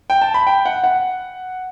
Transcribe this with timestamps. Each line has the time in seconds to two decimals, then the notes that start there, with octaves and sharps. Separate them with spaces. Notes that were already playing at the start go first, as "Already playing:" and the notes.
0.10 G5
0.21 A5
0.34 B5
0.47 G5
0.65 F#5
0.84 F#5